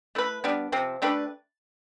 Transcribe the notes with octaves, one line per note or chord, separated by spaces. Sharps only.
A3 E4 B4
G3 B3 D4
C3 F3 C4
A3 D4 G4 B4